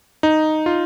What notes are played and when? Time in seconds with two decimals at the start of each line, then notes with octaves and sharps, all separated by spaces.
0.23 D#4
0.66 F4